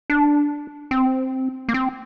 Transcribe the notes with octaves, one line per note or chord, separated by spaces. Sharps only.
D4
C4
A#3
C4